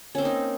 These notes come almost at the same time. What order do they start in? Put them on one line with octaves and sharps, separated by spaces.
C#4 C4 A#3 D#4